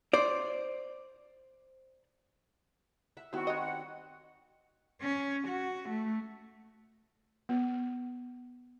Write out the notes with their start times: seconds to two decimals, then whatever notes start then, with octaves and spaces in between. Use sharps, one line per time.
0.13 C5 D5
3.17 E5 F#5
3.33 D#3 G3 B3 C4 E4 F#4
3.47 C#5 D#5
3.60 F#5
5.01 C#4
5.48 F#4
5.89 A3
7.49 B3